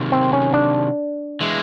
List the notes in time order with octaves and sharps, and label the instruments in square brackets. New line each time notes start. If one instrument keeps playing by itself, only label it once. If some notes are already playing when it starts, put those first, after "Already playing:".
Already playing: [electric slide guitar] C3 D#3 F#3
[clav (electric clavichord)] C4
C#4
D4
[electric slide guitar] E3 G#3